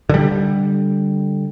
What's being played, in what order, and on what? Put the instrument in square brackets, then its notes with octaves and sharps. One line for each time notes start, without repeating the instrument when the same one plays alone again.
[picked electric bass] D3 G3